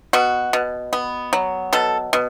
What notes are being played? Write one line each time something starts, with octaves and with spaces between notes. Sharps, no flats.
B2 F#4
B2
B3
F#3
B2 A4
B2